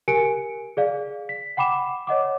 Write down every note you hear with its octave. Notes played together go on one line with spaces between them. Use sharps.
G4 A#4 G#5 C#7 D7
G#4 D5 F5
B6
F#5 G5 B5 D6 E7
C#5 D#5 F#5 D6